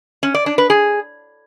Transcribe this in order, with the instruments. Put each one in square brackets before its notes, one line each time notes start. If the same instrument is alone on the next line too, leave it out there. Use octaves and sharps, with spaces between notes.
[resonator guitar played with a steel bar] C#4
D5
D4
B4
G#4